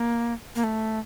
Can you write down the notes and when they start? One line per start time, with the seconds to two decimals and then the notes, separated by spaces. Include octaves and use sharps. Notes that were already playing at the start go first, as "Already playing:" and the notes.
Already playing: A#3
0.55 A#3
0.64 A3